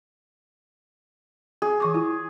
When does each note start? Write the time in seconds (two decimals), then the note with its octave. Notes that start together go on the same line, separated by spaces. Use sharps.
1.62 G#4
1.80 E3 C#6 D6
1.94 E4 F4